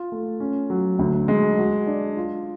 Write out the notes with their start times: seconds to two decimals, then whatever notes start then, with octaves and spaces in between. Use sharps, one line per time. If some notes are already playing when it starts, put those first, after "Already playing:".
Already playing: F4
0.12 A3
0.40 C#4
0.70 F#3
0.99 D2
1.28 G#3
1.58 F#4
1.87 D4
2.17 F4